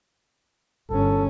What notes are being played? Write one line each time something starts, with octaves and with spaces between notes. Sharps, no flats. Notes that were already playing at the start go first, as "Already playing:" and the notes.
G1 C#4 A4